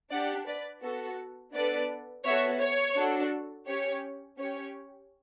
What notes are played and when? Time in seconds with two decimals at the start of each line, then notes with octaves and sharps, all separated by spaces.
0.12 D4 G4 D5 F#5
0.47 B4 D5
0.82 B3 F#4 A4
1.54 B3 D4 A4 B4 D5
2.25 B3 F#4 A4 C#5 E5
2.61 C#5
2.97 D4 F#4 A4
3.67 C#4 G4 C#5
4.38 C#4 G4 C#5